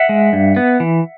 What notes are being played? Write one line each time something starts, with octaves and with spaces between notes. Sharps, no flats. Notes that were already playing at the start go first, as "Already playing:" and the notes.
Already playing: E5 F#5
G#3
G2
B3
E3